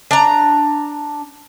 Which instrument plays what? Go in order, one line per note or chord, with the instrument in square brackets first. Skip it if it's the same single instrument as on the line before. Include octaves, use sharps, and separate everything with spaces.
[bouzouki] D4 A#5